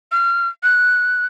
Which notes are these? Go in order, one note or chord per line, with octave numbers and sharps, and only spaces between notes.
F6
F#6